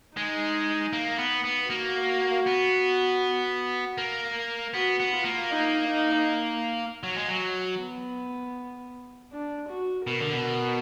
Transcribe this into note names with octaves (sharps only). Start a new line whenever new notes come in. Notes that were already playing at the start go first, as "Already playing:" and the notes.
G#3 D#4
A#3
B3
B3
A#3 F#4
B3
A#3
B3 F#4
B3
F4
A#3
D#4
D#4
F#3
G#3
F#3
B3
D4
F#4
B2 A#4
D3
B2